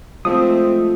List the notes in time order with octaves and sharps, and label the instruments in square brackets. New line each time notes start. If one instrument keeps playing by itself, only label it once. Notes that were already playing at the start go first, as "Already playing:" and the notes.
[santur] F3 [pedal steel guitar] G#3 A3 E5 [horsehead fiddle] C4 [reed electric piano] D#6